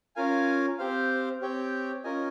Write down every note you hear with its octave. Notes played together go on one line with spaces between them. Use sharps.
C#4 F4 A#4 F5 G#5
C4 G4 C5 F5
C4 G4 C#5 G5
C#4 F4 A#4 D#5 G#5